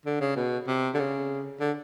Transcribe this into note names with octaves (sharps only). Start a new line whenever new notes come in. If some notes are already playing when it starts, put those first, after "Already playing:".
D3
C#3
B2
C3
D3
C#3
D3